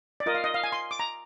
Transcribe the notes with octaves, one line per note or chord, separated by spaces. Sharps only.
D5
F4 A#4 D#5
F5
D#5
F5
G#5
C6
D6
A#5